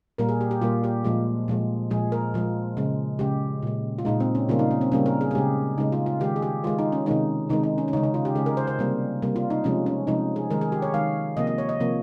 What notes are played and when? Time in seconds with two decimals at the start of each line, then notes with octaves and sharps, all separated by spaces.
0.18 A#2 G3 A#3 A#4
0.29 G#4
0.41 G4
0.51 G4
0.61 A#2 G3 A#3 F4
0.84 G4
1.04 A#2 F3 G#3
1.48 A#2 F3 G#3
1.91 A#2 F3 G#3 G#4
2.12 A#4
2.34 A#2 F3 G#3
2.77 C#3 G#3
3.19 C#3 G#3 G4
3.62 A#2 G#3
3.98 F4
4.05 A#2 G#3 D#4
4.20 C4
4.35 C#4
4.49 C#3 G3 A#3 F4
4.59 D#4
4.71 C#4
4.81 C4
4.92 C#3 G3 A#3 C#4
5.06 A#4
5.21 G#4
5.31 G#4
5.35 C#3 G#3 G4
5.78 C#3 G#3 D#4
5.92 F4
6.06 F4
6.20 D#3 G#3 G4
6.36 G#4
6.42 G4
6.63 D#3 G#3 F4
6.79 D#4
6.92 C#4
7.06 C3 D#3 G#3 D#4
7.50 C3 D#3 G#3 D#4
7.63 D#4
7.78 C#4
7.88 C#4
7.93 C#3 G#3 D#4
8.03 D#4
8.14 F4
8.25 G4
8.35 C#3 G#3 G#4
8.46 A#4
8.57 C5
8.67 C5
8.79 C3 G3 A#3
9.22 C3 G3 A#3
9.36 F4
9.50 D#4
9.64 C3 F3 G#3 C#4
9.86 C#4
10.07 C3 F3 G#3 D#4
10.36 G#4
10.51 D#3 G#3 A#4
10.61 G#4
10.72 G4
10.82 C#5
10.94 D#3 G#3 F5
11.37 C3 F3 A#3 D#5
11.47 D#5
11.58 C#5
11.69 D#5
11.80 C3 F3 A#3